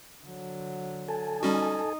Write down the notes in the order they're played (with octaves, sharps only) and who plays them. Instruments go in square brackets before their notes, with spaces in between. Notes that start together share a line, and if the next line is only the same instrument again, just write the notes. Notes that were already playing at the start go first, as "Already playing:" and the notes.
[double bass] D3 F#3
[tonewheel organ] A4 G#5 A5
[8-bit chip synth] G3 C#4 F#4 [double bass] D#4